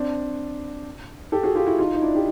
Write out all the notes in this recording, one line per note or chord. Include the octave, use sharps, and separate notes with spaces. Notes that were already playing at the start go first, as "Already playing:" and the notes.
Already playing: C4 D4
G4 A4
F#4 G#4
F4 G4
E4 F#4
D#4 F4
D#4
D4 E4
G4